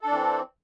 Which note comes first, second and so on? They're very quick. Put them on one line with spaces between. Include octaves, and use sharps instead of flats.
A4 D4 E3 C4